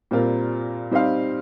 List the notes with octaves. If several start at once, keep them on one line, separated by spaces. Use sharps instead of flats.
A#2 G3 C4 F4 A#4
G3 C4 D#4 C5 F5